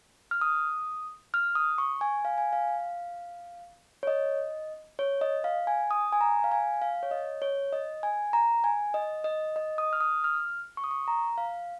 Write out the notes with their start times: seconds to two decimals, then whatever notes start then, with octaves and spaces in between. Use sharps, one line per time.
0.31 F6
0.41 D#6
1.34 F6
1.55 D#6
1.78 C#6
2.01 G#5
2.25 F5
2.38 G#5
2.53 F5
4.03 C#5
4.07 D#5
4.99 C#5
5.21 D#5
5.44 F5
5.67 G#5
5.91 D#6
6.12 G#5
6.21 A#5
6.44 F5
6.51 G#5
6.82 F5
7.03 C#5
7.11 D#5
7.42 C#5
7.73 D#5
8.03 G#5
8.33 A#5
8.64 G#5
8.94 D#5
9.24 D#5
9.56 D#5
9.78 D#6
9.93 F6
10.01 D#6
10.24 F6
10.77 C#6
10.84 D#6
10.91 C#6
11.08 A#5
11.38 F5